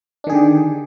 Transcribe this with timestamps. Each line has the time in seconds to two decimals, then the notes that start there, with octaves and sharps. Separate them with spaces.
0.24 D4
0.27 D#3
0.30 G#4
0.32 D3
0.35 G4